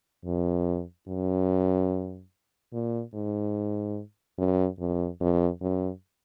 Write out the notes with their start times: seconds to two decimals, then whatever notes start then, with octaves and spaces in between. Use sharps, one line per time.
0.25 F2
1.08 F#2
2.73 A#2
3.14 G#2
4.38 F#2
4.79 F2
5.20 F2
5.61 F#2